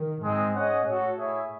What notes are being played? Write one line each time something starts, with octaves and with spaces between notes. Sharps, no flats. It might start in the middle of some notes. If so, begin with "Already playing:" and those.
Already playing: D#3
G#2 G#3 C4 D#4
C#4 G#4 D#5 F#5
A2 F#4 A4 C#5
E4 G#4 C#5 E5